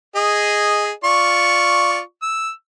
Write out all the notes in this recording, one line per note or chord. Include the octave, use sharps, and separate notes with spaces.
G#4 D#5
F4 D5 C#6
E6